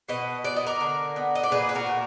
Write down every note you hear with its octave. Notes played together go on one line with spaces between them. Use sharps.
B2 B4 D#5
B3 D5
D#5
A#4 D5
D3
B3
D#5
D5
A#2 G#4 B4
B4
F#4 A#4
A#2